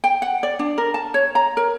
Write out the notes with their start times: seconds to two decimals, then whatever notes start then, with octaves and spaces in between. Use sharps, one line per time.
0.04 G5
0.22 F#5
0.43 D5
0.59 D4
0.78 A#4
0.94 A5
1.14 C#5
1.35 A#5
1.57 A#4